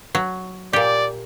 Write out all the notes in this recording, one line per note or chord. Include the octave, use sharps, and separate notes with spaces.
F#3
A#2 G4 D5